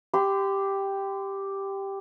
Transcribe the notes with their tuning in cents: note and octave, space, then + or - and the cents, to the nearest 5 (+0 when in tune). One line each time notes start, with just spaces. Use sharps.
G4 +0 C6 -40